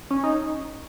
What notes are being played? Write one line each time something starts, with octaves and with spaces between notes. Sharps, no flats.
C#4
D#4